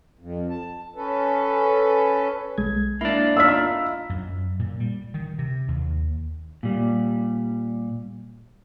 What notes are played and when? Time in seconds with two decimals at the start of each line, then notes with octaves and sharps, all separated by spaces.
0.19 F2
0.50 A5
0.96 C#4 A4 B4
2.58 B1 G#3 G#6
3.01 A#3 D4 E4
3.37 D#4 F4 D#5 E6 F6 B6
4.09 F#2
4.59 A#2
4.80 G3
5.14 D#3
5.39 C3
5.68 D#2
6.63 A#2 G3